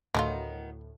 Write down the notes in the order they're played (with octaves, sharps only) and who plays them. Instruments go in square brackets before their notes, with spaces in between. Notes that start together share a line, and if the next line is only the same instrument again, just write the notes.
[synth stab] D2 A2 [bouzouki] D#3 B3 [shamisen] F#3 A3 F4